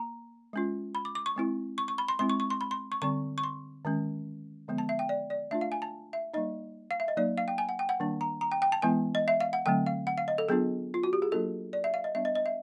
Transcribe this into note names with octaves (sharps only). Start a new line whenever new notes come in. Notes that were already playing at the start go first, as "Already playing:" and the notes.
Already playing: A#3 A#5
G#3 C#4 F4
B5
D6
D6
C#6
G#3 C4 E4
C#6
C#6
B5
C6
G#3 C4 E4 C6
C#6
C#6
C6
B5
C6
C#6
D3 G3 C4 C#6
C#6
C6
D#3 G#3 C#4
D3 F3 G#3 B3
A5
E5
G5
D5
D5
A3 D4 F4 E5
F5
G#5
A5
E5
G3 A#3 D#4 D#5
F5
E5
D#5
F#3 A#3 D#4 D5
F5
G5
G#5
F#5
G5
F#5
D#3 G3 A#3 D4
A#5
A#5
G5
G5
A5
E3 G#3 B3 E4 G#5
D#5
E5
F5
F#5
D3 F#3 A3 C4 G5
F5
F#5
F5
D#5
A4
F#3 B3 D4 F4 G#4
F4
F#4
G4
G#4
F#3 A#3 D4 F4 A4
D5
E5
F5
D#5
G3 B3 D4 E5
D#5
D#5
E5